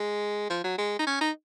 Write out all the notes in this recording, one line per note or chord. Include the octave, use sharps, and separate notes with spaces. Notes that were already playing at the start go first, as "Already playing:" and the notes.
Already playing: G#3
F3
F#3
G#3
D#4
C#4
D#4